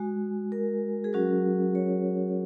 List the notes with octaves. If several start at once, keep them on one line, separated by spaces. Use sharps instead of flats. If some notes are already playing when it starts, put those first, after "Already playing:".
Already playing: G#3 F#4 G#5
A#4
G#4
F#3 C#4 F#4 A#4
C#5